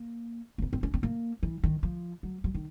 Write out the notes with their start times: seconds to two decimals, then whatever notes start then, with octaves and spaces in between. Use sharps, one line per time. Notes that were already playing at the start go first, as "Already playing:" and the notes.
Already playing: A#3
0.58 A#3
0.62 B3
0.73 C4
0.83 C#4
0.94 C4
1.03 A#3
1.43 E3
1.63 D#3
1.83 F3
2.23 F#3
2.44 F#3
2.54 D#3